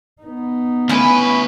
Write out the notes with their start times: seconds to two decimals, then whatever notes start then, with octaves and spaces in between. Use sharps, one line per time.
0.22 B3 D#4
0.89 D2 C#4 E4 B4 B5